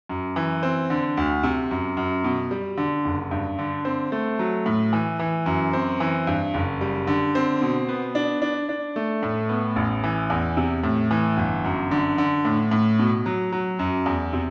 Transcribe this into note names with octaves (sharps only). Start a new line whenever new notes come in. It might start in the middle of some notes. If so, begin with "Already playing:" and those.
F#2
E3
C4
D3
D2
C3
F#2
F#2
B2
G3
D3
F#1
G2
D3
C4
A3
F#3
A2
E3
E3
F#2
C4
E3
G2
F#1
G3
D3
C4
B2
B3
D4
D4
D4
A3
A2
B3
A1
E3
E2
C3
A2
E3
G1
F#2
D3
D3
A2
A2
B2
F#3
F#3
F#2
E2
C3